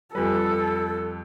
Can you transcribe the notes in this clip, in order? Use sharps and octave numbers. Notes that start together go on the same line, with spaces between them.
F2 G3 G4 A4 B4 G#5